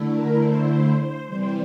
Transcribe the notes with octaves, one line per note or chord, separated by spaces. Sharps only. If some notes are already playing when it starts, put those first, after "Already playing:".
Already playing: D3 A3 E4
A#4
C5
C5
C5
C3 E3 G3 C5